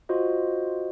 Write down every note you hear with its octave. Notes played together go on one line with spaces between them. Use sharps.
F4 F#4 C5 D#5